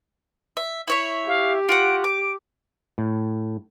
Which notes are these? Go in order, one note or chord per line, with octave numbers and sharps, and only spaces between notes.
E5
E4 C#5 E5
G4 F5
F4 F#4 F#5 D7
D6 D7
A2